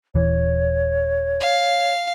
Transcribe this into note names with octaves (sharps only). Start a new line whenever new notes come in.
D#1 E3 C#5
F5